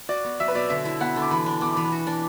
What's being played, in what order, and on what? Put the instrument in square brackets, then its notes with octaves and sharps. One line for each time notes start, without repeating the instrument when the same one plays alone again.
[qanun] F#4 [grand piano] D5
[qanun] B3
[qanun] F#3 [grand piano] E5
[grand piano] B4
[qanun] B2 [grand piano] D5
[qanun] D3 [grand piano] E5
[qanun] E4
[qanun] B3 [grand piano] F#5
[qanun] D3
[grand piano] D6
[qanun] E3 [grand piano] B5
[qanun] D4
[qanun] B3 [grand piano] D6
[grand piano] D6
[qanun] E3 [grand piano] B5
[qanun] F#4
D4